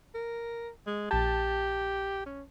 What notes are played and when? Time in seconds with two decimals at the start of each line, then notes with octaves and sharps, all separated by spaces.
0.15 A#4
0.86 G#3
1.11 A#1 G4 A5
2.26 C#4